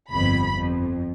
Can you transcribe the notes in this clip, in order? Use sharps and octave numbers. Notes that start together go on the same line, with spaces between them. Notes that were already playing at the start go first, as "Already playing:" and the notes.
G1 F2 B5
F2